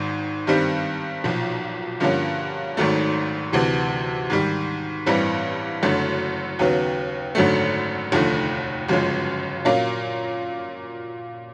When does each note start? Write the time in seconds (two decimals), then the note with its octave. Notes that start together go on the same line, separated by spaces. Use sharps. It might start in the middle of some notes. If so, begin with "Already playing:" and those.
Already playing: G#1 G#2 D#3
0.47 G2 D#3 G3 C4
1.24 B1 A#2 F3
2.00 G2 D3 F3 A#3 C#4
2.77 G#1 G#2 D#3 F#3 A3
3.53 D2 C3 E3
4.30 G#2 D#3 G3
5.06 A1 G2 E3 G3 C4
5.83 F#1 F#2 D3 F#3 A3
6.59 D#2 C#3 F#3 B3
7.35 G#1 F#2 D3 F#3 A3
8.12 F1 D#2 D3 F3 A3
8.88 G1 F#2 C#3 F3 G#3
9.65 A#2 F#3 A#3 C#4 F4